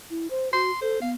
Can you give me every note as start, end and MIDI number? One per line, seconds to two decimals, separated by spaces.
0.10 0.27 64
0.30 0.51 72
0.53 0.71 66
0.53 0.79 84
0.81 1.01 69
0.81 0.99 72
1.02 1.15 59
1.02 1.11 77